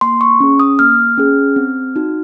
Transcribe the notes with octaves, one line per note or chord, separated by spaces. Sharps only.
A#3 C6
C#6
C#4 G#4
D#6
A#3 F6
C#4 G#4
C4
D#4 F#4